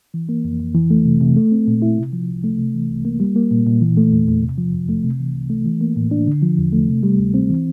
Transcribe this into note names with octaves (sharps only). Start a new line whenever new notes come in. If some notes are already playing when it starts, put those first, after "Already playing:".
E3
A#3
F2
F2
E3
A3
C3
C3
A3
C4
A#2
E4
C3
F3
C2
A3
C3
E3
C2
A#3
G3
A#3
A#2
A#2
E3
A3
E2
E2
C3
F3
F2
A3
C3
E3
C2
A3
E3
A#3
A2
D4
D3
F3
E2
A3
C3
G3
D2
C4
E3